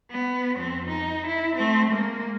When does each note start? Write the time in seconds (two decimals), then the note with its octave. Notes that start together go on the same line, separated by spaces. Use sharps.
0.10 B3
0.57 F2 C4
0.88 D#4
1.27 E4
1.57 A3 C4
1.91 G#3 A#3